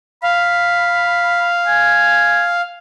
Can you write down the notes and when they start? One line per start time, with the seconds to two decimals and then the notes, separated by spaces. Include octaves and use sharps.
0.23 F5 B5
1.67 G#5